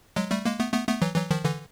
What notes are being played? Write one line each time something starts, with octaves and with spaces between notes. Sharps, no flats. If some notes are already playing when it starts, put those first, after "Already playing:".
F#3 G#3
G3 A3
G#3 A#3
A3 B3
A3 B3
A3 B3
E3 F#3
E3 F#3
D#3 F3
D3 E3